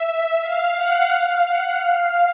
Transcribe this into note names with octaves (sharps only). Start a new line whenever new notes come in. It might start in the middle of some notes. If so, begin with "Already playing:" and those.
Already playing: E5
F5
F#5
F5
F#5
F5